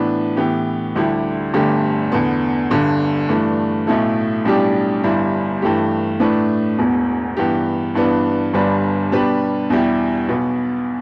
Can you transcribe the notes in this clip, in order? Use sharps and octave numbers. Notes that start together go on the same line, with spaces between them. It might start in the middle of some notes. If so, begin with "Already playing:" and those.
Already playing: A2 E3 B3 D4 B4
A2 E3 B3 G4
D2 D3 G3 E4 G4
G1 G2 D3 A3 G4
E2 D3 B3
G1 G2 D3
G2 E3 A3 D4
B1 A2 A3 E4 A4
B1 A2 G3 D4 G4
G1 G2 G3 E4
G2 E3 A3 G4
A2 A3 D4 B4
E1 E2 B2
G2 E3 B3 G4
G2 E3 B3 D4 B4
G1 G2 G3 D4 B4
B2 G3 D4 G4 B4
E2 B2 G3 E4 G4
B1 B2 B3